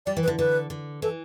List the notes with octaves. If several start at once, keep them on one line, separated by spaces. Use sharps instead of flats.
G3 D5
E3
B4
D3
D3 B4
D3
E3 A4